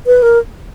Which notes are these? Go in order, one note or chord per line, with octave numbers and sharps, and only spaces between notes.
B4
A#4